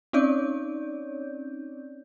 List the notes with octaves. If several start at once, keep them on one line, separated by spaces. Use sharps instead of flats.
C4 C#4 D#4 C#5 D5 G6